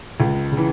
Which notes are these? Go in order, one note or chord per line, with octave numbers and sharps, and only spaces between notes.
C#2
C#3
E3